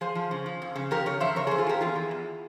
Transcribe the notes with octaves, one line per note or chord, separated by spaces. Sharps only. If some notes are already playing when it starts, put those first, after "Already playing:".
F3 G#4 C5
F3
C#3
F3
F2
C#3
F2 G4 A#4
C#3 A#4 C#5
F2 C5 E5
C#3 A#4 C#5
F2 G#4 C5
F4 G#4
F3 G4 A#4
E2 F4 G#4
E3
E2